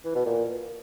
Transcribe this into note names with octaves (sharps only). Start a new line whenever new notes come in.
E3
B2
A#2